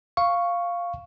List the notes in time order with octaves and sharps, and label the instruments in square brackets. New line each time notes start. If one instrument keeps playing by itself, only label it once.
[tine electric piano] F5 C#6